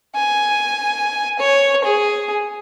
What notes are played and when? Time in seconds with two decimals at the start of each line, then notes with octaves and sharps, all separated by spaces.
0.15 G#5
1.40 C#5
1.84 G#4